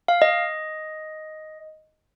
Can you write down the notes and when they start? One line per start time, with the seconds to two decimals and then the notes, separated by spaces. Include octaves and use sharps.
0.08 F5
0.22 D#5